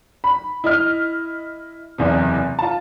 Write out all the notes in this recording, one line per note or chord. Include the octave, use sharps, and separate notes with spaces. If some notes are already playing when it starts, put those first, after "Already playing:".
B5
E4 D#5 F6
F#1 E2 C3
F4 A5